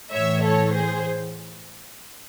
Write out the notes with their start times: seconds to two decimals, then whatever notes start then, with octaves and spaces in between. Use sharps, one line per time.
0.13 A2 E3 C#5 E5
0.44 A4 C#5
0.75 G#4 C5